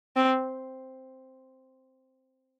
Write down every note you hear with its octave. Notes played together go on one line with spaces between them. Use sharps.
C4